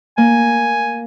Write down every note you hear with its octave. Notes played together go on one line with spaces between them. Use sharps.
A#3 G#5